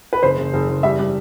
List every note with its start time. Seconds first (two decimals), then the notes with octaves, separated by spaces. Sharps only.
0.13 B4
0.23 F#1 C5
0.38 F#1
0.53 F#1
0.69 F#1
0.83 G3 E5
0.99 G3